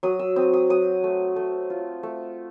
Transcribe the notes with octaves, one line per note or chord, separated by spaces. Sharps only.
F#3 D#6
E6
C4 D#6
D#6
F#3 D#6
A3
A3
F4
A3